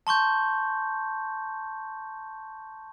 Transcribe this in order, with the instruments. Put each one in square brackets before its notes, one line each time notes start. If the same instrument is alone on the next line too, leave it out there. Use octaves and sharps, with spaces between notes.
[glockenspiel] A5 C6 C#6 G6